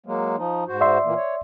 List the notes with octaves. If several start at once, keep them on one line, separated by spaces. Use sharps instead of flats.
F#3 G#3 A#3
F3 D#4
G#2 F#4 C5
D5 E5 C6
A#2 E3 A#3
C#5